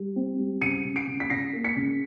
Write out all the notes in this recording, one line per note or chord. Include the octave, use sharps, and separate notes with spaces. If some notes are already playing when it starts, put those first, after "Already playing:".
Already playing: G3
C4
G3
C#3 C#7 D#7
C#3
C7 D7
C#3
B6
C#3 A#6 C7
A#3
B6 C#7
C#3